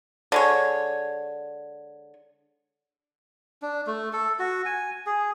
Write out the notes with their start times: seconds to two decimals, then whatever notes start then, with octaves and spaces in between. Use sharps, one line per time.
0.32 D3 G#3 C#5
3.62 D4
3.87 A3
4.13 A4
4.39 F#4
4.65 G#5
5.06 G#4